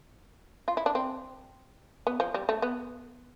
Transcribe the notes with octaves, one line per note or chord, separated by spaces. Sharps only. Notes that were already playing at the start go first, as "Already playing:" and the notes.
F4
E4
D4
C4
B3
F3
G3
A3
B3